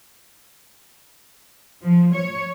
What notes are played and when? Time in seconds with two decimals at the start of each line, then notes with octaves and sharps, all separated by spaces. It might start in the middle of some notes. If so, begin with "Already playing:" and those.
1.82 F3
2.14 C#5